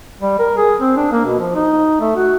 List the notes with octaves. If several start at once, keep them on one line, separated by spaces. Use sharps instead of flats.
G3
A#4
G#4
C4
D4
A#3
B2
F3
D#4
A3
F#4